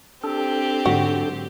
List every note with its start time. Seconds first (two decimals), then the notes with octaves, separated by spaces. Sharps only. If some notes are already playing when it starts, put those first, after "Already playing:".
0.24 C4 D4 G4 A4
0.86 G#2 D3 F#3 F#4